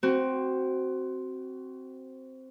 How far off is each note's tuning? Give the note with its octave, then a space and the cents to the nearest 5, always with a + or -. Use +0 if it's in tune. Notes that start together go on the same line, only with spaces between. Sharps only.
C4 +0 F#4 +20